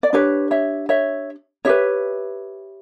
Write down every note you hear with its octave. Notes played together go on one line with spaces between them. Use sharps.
D5
D4 G4 B4 C#5
C#5 E5
C#5 E5
E4 G4 B4 C#5 E5